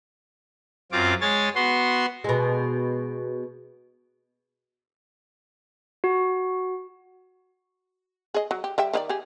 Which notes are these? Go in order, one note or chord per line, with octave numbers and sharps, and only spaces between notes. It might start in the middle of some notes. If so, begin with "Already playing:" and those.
F#2 C4 F4 D6
G#3 C#5 G#5 A6
B3 F#4 C6
B2 G#3
F#4
G#4 D#5
F#3
G4
G3 E5 G5
D#3 D#4 D5
G4 G#4